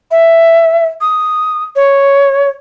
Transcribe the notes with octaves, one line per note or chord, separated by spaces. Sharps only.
E5
D#6
C#5